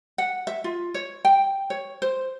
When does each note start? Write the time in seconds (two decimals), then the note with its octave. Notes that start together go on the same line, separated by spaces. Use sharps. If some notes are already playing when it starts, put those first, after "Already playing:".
0.18 F#5
0.47 E5
0.64 F4
0.94 C#5
1.25 G5
1.70 C#5
2.02 C5